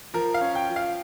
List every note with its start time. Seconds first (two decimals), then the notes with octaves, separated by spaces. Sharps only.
0.14 F3 A#4
0.34 F5
0.41 C#4
0.55 G5
0.69 F3
0.76 F5